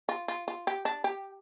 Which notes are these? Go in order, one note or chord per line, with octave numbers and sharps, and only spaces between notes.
F4
F4
F4
G4
D4
G4